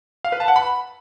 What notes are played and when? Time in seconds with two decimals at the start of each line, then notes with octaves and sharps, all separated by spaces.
0.25 F5
0.32 B4
0.40 A5
0.48 F#5
0.56 B5